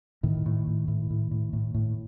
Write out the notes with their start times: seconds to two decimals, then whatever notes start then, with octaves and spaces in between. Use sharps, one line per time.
0.23 A2 D#3
0.46 A2
0.67 A2
0.88 A2
1.10 A2
1.31 A2
1.53 A2
1.74 A2